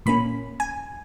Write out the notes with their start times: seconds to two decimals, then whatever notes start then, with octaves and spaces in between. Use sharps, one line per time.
0.06 A#2 A#3 C#4 B5
0.60 G#5